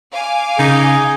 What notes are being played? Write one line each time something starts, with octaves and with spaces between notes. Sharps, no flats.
F5 G#5 D6
C#3 D#4 G#4